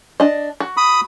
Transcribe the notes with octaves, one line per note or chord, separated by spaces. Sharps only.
D4 D#5
F#4
B5 D#6